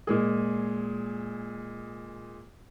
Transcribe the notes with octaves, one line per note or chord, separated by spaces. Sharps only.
A#2 G#3 G#4